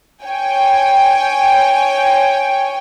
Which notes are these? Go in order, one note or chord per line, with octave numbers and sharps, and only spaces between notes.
C#5 G5 G#5